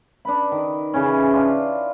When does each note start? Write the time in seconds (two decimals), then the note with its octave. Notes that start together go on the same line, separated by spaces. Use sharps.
0.25 D4 B4 B5
0.51 D#3
0.94 C#3 E3 C#4
1.33 D4 F4